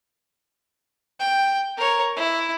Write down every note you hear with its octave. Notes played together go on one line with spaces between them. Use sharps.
G5
A#4 C#5
E4